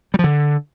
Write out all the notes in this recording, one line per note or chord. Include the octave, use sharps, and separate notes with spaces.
G3
F3
D3